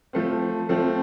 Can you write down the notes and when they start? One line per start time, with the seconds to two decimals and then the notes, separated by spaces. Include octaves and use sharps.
0.13 F3 A3 C4
0.69 F3 A3 C4